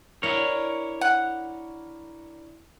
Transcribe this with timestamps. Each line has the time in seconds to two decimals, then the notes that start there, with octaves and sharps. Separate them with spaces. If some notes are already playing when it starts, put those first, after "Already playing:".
0.23 D4 E4 A#4 C#5
1.01 F#5